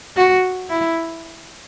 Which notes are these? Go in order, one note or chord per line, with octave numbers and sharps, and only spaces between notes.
F#4
E4